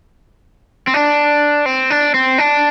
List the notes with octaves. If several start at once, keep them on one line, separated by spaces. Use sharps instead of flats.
C4
D4
C4
D4
C4
D4